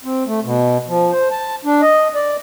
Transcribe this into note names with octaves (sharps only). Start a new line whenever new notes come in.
C4
A3
B2
F3
C5
A5
D4
D#5
D5